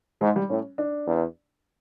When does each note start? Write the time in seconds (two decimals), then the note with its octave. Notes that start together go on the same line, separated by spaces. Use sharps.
0.21 G#2 G#3
0.36 G3
0.50 A2 C#4
0.78 D4
1.07 E2